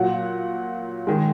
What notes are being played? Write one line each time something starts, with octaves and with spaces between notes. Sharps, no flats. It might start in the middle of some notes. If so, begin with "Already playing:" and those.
Already playing: A#2 F#3 F#5
D#3 G#3